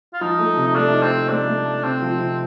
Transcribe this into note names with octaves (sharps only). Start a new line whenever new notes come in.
F4
F3 D#4
A3
C3
D#4
A3 D4
D#4
C4
D#4
A3 D4
A3
A3
C3 C4
F3
C3